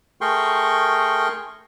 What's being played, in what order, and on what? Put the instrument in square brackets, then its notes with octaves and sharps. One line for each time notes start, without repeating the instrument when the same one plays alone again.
[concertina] A3 G#4 A#4 G5 C6 C#6